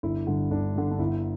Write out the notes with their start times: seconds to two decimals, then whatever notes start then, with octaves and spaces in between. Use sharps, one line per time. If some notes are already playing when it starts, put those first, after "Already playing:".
0.03 G1 E4
0.27 G2 D3
0.51 G1 D4
0.76 G2 D3
0.91 D4
0.99 G1 E4